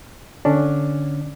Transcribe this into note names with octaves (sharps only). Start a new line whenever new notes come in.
D3 C#4 D4